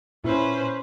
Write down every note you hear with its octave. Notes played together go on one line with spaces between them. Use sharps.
A#2 C#4 E4 B4 C5